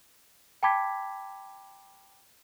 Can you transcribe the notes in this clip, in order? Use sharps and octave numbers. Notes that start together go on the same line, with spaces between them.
G5 A5 B5 D6 G#6 B6